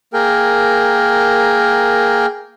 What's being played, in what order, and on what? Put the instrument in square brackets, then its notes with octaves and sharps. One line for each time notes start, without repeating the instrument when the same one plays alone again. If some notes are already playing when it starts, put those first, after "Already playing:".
[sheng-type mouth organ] A#3 G#4 A#4 G5